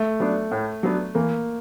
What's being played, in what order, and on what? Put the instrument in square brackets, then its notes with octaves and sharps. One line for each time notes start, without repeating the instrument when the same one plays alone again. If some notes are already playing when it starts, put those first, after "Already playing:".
Already playing: [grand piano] A3
[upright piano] F#3 B3 D4
A2
F#3 B3 D4
[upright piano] E3 [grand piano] A#3